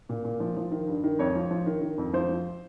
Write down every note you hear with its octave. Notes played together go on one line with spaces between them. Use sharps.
A#2
A#2
F3
F3
D#3
G2
D#3
F2 C#5
F3
F3
D#3
D#3
F2
F3 C5
F3